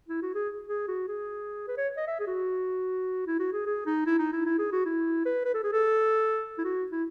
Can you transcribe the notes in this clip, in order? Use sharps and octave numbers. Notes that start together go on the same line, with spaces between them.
E4
F#4
G#4
G#4
F#4
G#4
B4
C#5
D#5
E5
G#4
F#4
E4
F#4
G#4
G#4
D#4
E4
D#4
E4
E4
G#4
F#4
E4
B4
B4
A4
G#4
A4
E4
F#4
E4